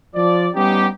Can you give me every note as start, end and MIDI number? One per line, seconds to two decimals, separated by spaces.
0.15 0.49 53
0.15 0.49 74
0.55 0.86 55
0.55 0.86 59
0.55 0.86 61
0.55 0.86 63
0.55 0.86 67